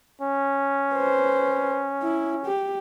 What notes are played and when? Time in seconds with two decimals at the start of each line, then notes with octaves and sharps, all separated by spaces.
0.21 C#4
0.93 B4 C5
2.03 E4
2.46 G4